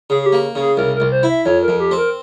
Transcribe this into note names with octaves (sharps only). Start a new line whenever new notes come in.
C#3 G#4
G#4
G4
A#3
C#3 G#4
C2 A#4
C2 A#4
C5
E4
E5
F2 C#5
A#4
F2
G4
C4
A#4